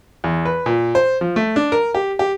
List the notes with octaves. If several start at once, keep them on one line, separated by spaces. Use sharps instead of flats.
E2
B4
A#2
C5
F3
A3
D4
A#4
G4
G4